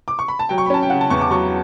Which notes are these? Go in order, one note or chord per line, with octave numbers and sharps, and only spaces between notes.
D6
C#6
B5
A5
F#3 G5
C#6
B5
C#4 A5
G5
C#3 F#5
A5
E2 C#6
D6
F#3 C#6